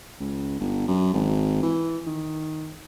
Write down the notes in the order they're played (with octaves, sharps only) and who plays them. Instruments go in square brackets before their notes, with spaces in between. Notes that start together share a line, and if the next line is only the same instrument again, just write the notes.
[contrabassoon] C#2
G1
F#2
G#1
E3
D#3